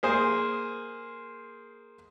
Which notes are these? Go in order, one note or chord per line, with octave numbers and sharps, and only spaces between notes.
A#3 G#4 C5